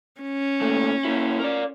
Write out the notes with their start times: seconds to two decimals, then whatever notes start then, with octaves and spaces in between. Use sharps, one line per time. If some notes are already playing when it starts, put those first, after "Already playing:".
0.22 C#4
0.61 A#2 A3
1.05 A#3 E4
1.40 A#4 D5